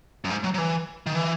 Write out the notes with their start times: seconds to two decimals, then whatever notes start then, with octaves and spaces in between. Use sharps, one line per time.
0.24 F#2
0.30 G#2
0.44 F#3
0.54 F#3
0.58 E3
1.06 D#3
1.15 E3